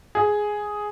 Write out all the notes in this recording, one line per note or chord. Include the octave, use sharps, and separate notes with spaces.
G#4